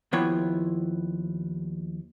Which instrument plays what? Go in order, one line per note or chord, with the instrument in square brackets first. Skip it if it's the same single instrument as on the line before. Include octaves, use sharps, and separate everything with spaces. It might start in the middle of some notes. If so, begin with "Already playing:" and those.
[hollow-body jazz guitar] D#2 F3 B3 E4 C#5 G5